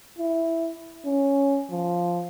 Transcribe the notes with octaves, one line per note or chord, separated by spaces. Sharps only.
E4
C#4
F3